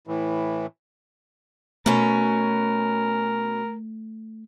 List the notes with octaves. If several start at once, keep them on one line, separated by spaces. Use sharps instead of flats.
A2 E3
B2 A3 C#4 A#4